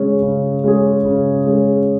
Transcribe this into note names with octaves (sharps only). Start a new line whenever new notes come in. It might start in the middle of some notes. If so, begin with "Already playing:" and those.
Already playing: C#3 G#3 C#4 G#4
C#3
G#3 C#4 G#4
C#3
G#3 C#4 G#4